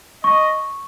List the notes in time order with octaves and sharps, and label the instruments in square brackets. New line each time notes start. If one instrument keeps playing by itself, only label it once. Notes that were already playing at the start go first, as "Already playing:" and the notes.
[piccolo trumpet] D#5 [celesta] C#6